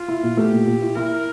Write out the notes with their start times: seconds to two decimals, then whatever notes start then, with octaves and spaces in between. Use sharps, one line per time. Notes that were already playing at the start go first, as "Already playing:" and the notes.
Already playing: F4
0.08 E4
0.23 A#2
0.37 A3 G4
0.53 A#2
0.67 A#2
0.81 E4
0.96 E4 A#4